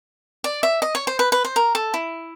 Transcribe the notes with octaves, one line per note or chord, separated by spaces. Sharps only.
D5
E5
D#5
C#5
C5
B4
B4
C5
A#4
A4
E4